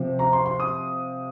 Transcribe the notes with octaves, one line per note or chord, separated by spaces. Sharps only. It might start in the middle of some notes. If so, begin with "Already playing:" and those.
Already playing: C3 F3 C4
A#5
C6
C6
D#6